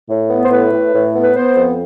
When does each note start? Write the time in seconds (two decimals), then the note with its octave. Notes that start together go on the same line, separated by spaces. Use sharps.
0.09 A2
0.30 B3
0.44 C5
0.50 A2 B4
0.72 A2
0.94 A2
1.14 B3
1.23 B4
1.36 B3 C5
1.56 F2